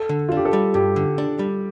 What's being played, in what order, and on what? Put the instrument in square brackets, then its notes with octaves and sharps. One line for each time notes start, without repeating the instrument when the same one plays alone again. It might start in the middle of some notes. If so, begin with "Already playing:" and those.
Already playing: [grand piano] A4
[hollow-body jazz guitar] D3
[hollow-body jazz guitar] D4 [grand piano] F4
[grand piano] G4
A4
[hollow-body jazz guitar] G3
[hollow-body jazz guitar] G2 [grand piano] G4
[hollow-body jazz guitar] D3
D4
G3